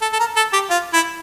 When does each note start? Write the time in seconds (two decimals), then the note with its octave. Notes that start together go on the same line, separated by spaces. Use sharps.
0.02 A4
0.12 A4
0.20 A#4
0.36 A4
0.53 G4
0.70 F4
0.93 E4